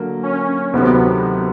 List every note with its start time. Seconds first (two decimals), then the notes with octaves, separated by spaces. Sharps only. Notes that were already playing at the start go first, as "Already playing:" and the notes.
Already playing: D3 F#3 A#3
0.23 C#4
0.73 D2 C3 D#3 F#3 B3